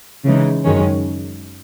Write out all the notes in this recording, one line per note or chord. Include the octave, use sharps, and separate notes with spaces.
C#3 E3 G#3 D#4
F#2 D#3 G#3 C#4